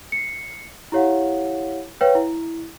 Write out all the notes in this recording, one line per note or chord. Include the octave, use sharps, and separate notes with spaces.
C7 C#7
E4 G4 C#5 F5 F#5
B4 C#5 F5 G5
E4